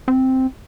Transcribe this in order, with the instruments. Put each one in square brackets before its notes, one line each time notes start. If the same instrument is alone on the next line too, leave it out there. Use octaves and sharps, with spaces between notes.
[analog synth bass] C4